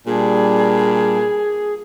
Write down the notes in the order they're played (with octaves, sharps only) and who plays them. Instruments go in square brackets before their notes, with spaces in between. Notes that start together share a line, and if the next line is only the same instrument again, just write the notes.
[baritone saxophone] A#2 [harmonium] G3 D4 [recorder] G#4